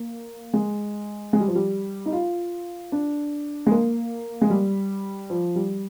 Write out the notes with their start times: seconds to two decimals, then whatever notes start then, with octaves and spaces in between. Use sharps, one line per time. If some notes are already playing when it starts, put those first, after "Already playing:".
Already playing: A#3
0.53 G#3
1.33 G#3
1.40 G3
1.48 F3
1.55 G3
2.06 D#4
2.12 F4
2.92 D4
3.66 G#3
3.71 A#3
4.41 G#3
4.50 G3
5.30 F3
5.56 G3